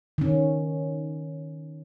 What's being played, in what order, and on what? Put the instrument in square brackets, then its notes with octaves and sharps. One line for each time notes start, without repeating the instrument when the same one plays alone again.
[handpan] D#3 C#4